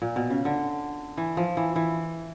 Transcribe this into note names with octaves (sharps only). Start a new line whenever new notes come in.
A#2
B2
C#3
D3
E3
F3
E3
E3